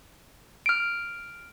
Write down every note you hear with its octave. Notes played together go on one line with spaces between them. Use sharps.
F6 D7